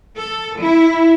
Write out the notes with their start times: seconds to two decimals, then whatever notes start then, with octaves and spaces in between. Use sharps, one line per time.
0.17 A4
0.60 E4